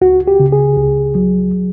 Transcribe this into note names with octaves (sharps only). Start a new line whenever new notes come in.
C#2 F#4
G4
C#3
G#4
C#2
F#3